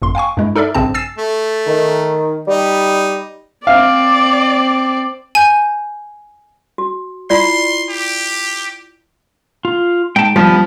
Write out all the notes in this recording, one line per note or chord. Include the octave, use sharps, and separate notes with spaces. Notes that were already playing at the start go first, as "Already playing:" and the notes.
G1 F#2 C6
F5 G5 G#5 C#6
G2 G#3 E4
D#4 A4 A#4 D5 E5
A#1 G2 C#3 C4 A5
G#5 E6 A6 C7 E7
A3
D#3
G3 D#4
C4 D5 F5
G#5 G6
F#4
E4 F4 D5 C6
G4
F4
G#2 G5 A5
G2 F3 G3 B3 B4